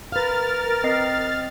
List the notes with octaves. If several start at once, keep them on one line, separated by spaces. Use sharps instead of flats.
A#4 B4 F5 F6 A6
C4 D#5 C7